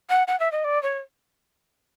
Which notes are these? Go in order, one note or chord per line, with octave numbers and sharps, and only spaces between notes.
F#5
F#5
E5
D#5
D5
C#5